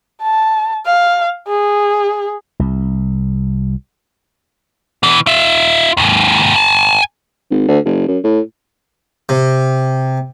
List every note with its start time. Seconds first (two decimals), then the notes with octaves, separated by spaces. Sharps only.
0.22 A5
0.85 F5
1.47 G#4
2.59 C2
5.03 B2 E3
5.27 F4 E5
5.97 D#2 G#2
6.56 G#5 A5
7.51 G#1
7.68 D2
7.85 F#1
8.08 F#2
8.24 A2
9.29 C3